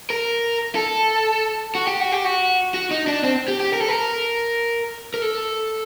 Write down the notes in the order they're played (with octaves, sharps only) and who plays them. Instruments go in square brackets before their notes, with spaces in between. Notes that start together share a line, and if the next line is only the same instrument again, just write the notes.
[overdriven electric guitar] A#4
A4
F#4
G4
F#4
G4
F#4
F#4
D#4
D4
C4
G4
G4
A#4
A4
A#4
A#4
A4